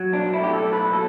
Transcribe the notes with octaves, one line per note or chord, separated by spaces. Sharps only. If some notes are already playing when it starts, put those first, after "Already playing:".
Already playing: F#3
B1 D4
E4
A2 G4
A4
B1
B4
B2 A4